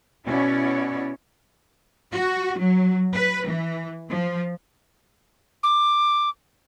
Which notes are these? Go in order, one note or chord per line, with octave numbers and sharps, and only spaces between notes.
B2 C#4 E4 C#5 D5
F#4
F#3
B4
E3
F3
D6